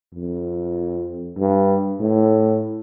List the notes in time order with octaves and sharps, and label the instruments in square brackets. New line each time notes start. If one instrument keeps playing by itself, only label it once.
[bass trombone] F2
G2
A2